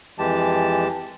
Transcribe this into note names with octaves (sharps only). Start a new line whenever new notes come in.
F2 E3 G#3 G4 A5